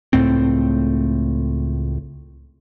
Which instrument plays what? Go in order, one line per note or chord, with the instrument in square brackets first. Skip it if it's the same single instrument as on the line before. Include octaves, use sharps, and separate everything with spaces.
[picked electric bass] C#2 A2 A3 C4